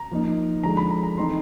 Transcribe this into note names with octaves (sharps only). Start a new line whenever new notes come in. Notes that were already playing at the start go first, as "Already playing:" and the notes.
Already playing: A#5
F3 A#3 D#4
D3 F3 G#3 A#5
B5
A#5
A#5
E3 A3 C4 D#4 C6